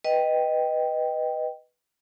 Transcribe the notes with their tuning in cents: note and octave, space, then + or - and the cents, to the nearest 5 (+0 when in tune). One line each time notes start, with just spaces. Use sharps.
B4 +0 D#5 +0 G5 +0